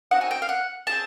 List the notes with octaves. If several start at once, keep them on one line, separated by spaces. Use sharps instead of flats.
C4 D#4 F#4 F#5
G#5
G5
F5
F#5
C4 F4 G#4 A5